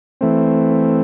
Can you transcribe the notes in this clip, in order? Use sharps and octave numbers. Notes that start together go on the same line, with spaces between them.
E3 A3 C4